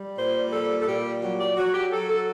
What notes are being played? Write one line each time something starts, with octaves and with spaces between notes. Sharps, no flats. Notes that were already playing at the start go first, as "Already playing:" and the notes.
Already playing: G3
A#2 C5
G3 A4
A4
A#2 G4
F#3 G4
D5
F#3 F#4
G4
F#3 A4
A4